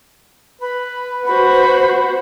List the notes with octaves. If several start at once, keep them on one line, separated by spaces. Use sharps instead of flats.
B4 B5
F#4 C5 B5